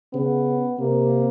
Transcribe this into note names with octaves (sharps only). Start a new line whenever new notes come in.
C#3 B3
C3 A#3